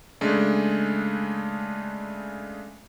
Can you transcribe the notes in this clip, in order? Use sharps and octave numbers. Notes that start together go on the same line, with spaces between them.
C#3 G#3 A3 D4